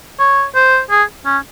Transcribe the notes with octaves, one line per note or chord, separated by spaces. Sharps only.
C#5
C5
G#4
C#4